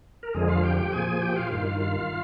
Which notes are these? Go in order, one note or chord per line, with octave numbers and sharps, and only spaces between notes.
A#4
F2 D3 F3 G#3 G#4
F4 F5
G4 G5
G4 G5
A#2 F3 G#4 G#5
G4 G5
F4 F5
G2 D#3
F4 F5